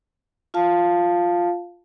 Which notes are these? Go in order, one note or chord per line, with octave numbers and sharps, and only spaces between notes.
F4 F5 A5